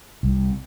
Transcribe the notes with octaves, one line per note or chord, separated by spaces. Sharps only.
C2